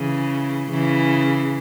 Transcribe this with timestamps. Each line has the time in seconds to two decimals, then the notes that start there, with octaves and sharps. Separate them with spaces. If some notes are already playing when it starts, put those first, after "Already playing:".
Already playing: C#3 E3
0.71 C#3 E3